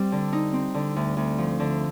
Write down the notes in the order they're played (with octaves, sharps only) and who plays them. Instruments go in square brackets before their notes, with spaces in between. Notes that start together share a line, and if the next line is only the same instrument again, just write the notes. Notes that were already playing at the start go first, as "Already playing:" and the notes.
Already playing: [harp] G3 C4
D3
D#4
C4
D3
D2
D2
F3
D3